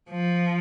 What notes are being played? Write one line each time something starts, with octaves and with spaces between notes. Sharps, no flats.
F3